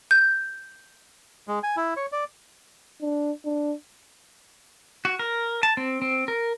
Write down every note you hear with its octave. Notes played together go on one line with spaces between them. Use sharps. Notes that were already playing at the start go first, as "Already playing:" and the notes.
G6
G#3
G#5
E4
C#5
D5
D4
D4
F#4
A#4
A5
C4
C4
A#4